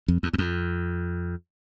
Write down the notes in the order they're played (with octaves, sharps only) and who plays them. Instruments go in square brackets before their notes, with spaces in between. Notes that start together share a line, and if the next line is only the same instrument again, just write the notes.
[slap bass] F2
E2
E2
F2